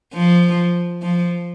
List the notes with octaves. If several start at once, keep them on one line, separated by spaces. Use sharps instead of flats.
F3
F3